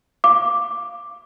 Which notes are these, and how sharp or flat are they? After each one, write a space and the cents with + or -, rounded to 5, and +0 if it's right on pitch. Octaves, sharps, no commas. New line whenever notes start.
F5 +0 D6 +0